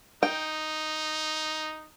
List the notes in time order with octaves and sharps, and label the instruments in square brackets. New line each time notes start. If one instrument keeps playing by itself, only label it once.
[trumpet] D#4 [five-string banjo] G5